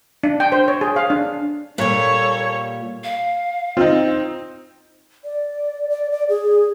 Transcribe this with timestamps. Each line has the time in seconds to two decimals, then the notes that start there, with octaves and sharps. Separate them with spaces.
0.23 D4
0.40 G5
0.52 C5
0.68 C#5
0.81 G#4
0.96 F5
1.10 D4
1.78 A#2 G3 A4 C#5
3.04 F5
3.77 C4 D#4 F4
5.25 D5
5.90 D5
6.12 D5
6.29 G#4